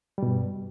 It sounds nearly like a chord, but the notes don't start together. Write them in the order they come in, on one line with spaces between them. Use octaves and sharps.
G3 B2 G2